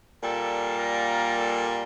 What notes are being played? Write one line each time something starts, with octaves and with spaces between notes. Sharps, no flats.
A#2 G3 A#3 A4
A#4
A4